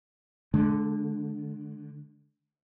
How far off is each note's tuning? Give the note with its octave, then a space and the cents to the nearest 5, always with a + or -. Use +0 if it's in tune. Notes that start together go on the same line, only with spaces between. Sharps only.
D3 +0 G#3 +40